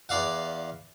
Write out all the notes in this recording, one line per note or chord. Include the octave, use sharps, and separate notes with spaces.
E2 D5 F5 F#5